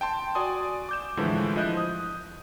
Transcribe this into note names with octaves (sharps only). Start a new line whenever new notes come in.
G5 A5 C6
F#4 D5 G#5 C6 D#6
D6 G6 E7
A2 D3 E3 F3 G#3
F3 E4 D#5 F#6 G6
D#6